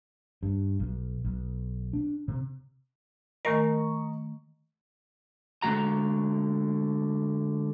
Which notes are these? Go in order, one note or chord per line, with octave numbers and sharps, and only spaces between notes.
G2
B1
B1
D4
C3
D#3 A3 A#4 D#5 G#5 A#5 C#6
D3 G#3 F#4 A#5